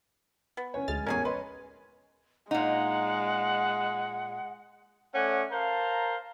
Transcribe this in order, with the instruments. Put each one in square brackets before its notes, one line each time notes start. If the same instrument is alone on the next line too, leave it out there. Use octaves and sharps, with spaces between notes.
[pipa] B3
[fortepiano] C#4 B4 C#5 [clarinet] G#5
[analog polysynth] D2 F6 A6 [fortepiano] G#3
[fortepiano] A1 E2 C#6 [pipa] C#4 G#4 G#5 [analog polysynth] A#4 [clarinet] C#5
[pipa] B4 [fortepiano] D#5 C6
[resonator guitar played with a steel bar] A#2 D#4 [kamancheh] G#3 [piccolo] F#5
[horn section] A3 C#4 D5 F#5
A#4 C5 F5 A5 A#5